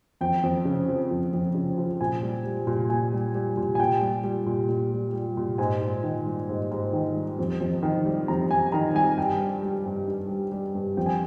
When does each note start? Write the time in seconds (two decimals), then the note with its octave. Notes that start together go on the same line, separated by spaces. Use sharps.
0.21 F2 G5
0.43 F2
0.65 C#3
0.87 F3
1.11 F2
1.33 F2
1.55 C#3
1.78 F3
2.01 A#2 G#5
2.22 G3
2.45 G3
2.67 A#2
2.90 A#2 G#5
3.12 G3
3.35 G3
3.57 A#2
3.75 G#5
3.79 A#2 G5
4.01 G3
4.24 G3
4.46 A#2
4.69 A#2
4.92 G3
5.13 G3
5.37 A#2
5.58 G#2 G#5
5.81 G#2
6.03 D#3
6.26 G3
6.49 G#2
6.71 G#2
6.93 D#3
7.15 G3
7.39 F2
7.60 F2
7.83 D#3
8.06 G3
8.28 F2 A#5
8.50 F2 G#5
8.72 D#3 A#5
8.95 G3 G#5
9.12 G#5
9.17 G2 G5
9.40 G3
9.63 G3
9.86 G2
10.08 G2
10.29 G3
10.52 G3
10.75 G2
10.97 F2 G5
11.06 G#5